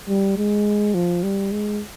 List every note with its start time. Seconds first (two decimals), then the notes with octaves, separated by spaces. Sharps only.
0.08 G3
0.37 G#3
0.94 F3
1.23 G3
1.51 G#3